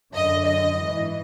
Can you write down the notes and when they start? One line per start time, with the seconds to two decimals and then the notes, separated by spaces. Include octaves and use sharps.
0.13 F#2 D3 D#5
0.45 D#5
0.78 G#2 E3